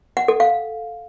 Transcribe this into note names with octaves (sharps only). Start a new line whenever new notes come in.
F#5
A4
F5